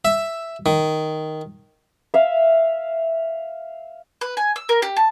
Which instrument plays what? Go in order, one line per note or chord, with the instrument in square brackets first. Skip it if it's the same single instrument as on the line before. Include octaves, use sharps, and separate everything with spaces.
[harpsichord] E5
D#3
[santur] E5 F5
[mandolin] B4
G#5
E6
A#4
G4
A5